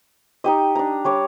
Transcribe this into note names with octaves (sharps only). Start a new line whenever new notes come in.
D#4 G4 D#5
D4 A#5
G3 C#5 D6